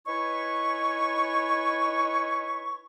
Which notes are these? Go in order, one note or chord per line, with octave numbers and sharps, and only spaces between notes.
D#4 E4 B4 C#5 G#5 C#6